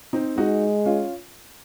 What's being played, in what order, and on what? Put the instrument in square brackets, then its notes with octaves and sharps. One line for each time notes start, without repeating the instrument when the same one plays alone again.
[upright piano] C4 D#4
[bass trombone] G#3 [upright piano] D#4 F#4
[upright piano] C#4 F4